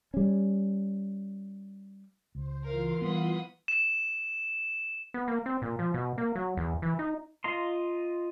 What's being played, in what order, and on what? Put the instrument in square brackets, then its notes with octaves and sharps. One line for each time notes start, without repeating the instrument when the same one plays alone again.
[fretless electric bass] G3 C#4
[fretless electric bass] C#2 [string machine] C5
[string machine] E3 F4 C6 [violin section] A#4 F5
[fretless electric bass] G3 B3 [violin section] B4 F#5 D#6
[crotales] E7
[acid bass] B3
A#3
C4
A#2
F3
B2
A#3
F#3
E2
E3
D#4
[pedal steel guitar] F4 D#5 A#5 C6